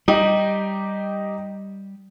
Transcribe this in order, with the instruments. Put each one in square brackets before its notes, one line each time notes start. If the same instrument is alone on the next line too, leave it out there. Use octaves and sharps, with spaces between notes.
[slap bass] G3 [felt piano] D#4 G4 D#5